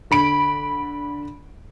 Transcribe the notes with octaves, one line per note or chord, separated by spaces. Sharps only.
D3 B5 D7